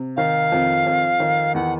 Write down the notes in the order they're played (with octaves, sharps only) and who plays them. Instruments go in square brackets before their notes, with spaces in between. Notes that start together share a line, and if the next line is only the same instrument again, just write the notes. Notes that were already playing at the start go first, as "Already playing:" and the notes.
Already playing: [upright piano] C3
[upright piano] D#3 [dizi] F5
[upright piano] F2
F2
D#3
[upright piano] E2 [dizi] F#5